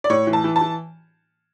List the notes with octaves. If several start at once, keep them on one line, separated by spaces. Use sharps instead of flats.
D5
A2 C#5
E3
A5
E3
A5
E3